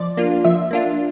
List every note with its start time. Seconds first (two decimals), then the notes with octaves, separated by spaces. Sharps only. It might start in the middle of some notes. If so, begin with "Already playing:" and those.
Already playing: F3 D5
0.17 A#3 D4 F4
0.44 F3 E5
0.71 A#3 D4 F4